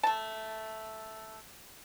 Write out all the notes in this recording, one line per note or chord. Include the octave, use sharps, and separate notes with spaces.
A3 A5